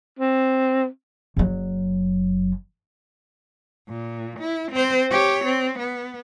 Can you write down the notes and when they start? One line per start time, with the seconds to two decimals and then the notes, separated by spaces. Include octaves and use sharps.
0.19 C4
1.37 F#1 F#3
3.89 A#2
4.40 E4
4.72 C4 C5
5.10 G4 C#5
5.45 C4
5.79 B3